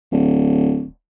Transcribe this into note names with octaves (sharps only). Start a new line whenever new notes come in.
D1